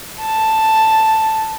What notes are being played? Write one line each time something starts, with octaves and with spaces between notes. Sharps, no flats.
A5